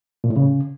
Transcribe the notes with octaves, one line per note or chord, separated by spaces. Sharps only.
A#2
A2
C#3